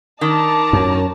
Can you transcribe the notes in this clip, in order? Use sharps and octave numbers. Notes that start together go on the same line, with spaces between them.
D#3 D5 A5 A#5
F#2